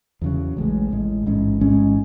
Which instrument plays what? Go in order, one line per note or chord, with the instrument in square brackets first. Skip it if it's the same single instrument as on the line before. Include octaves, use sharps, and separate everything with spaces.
[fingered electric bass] E2 C#3 F#3
A1 A2 G#3
A1 A2 G#3
A1 G#2 G#3 C#4
A1 G#2 G#3 C#4